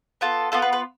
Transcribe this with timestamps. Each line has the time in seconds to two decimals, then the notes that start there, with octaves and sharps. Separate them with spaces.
0.21 B3 F4 A4
0.52 B3 F4 A4
0.62 B4
0.73 B4